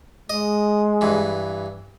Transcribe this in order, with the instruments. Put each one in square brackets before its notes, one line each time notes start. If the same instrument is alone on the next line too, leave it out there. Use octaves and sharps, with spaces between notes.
[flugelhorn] G#3 [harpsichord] D#5
[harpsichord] G2 E3